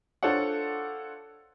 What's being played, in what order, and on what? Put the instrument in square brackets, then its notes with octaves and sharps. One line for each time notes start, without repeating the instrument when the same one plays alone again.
[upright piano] D4 F4 A4 C5 C#5 F#5